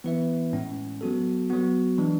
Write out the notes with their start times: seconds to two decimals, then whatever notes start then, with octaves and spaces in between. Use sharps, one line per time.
0.04 E3 B3 E4 B4 E5
0.53 A2 G#3 C#4
1.01 F#3 B3 F#4 A4
1.50 F#3 B3 F#4
1.98 E3 G#3 D4